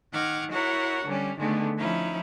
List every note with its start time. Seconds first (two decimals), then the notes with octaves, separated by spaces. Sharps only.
0.13 D#3 F#5 D6 F6 G#6
0.52 E4 F#4 A#4 C#5 F#5
1.06 D3 G3 C#4
1.39 D3 D#3 G#3 A3 B3
1.77 F3 C#4 D#4 E4